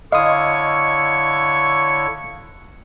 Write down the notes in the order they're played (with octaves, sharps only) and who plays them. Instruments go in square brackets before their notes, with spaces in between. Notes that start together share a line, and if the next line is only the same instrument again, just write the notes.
[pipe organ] D3 E4 C#5 [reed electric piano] D#5 C6 [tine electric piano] F5 D#6 [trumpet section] C#6